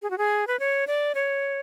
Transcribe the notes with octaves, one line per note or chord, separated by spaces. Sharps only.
G#4
F#4
G#4
B4
C#5
D5
C#5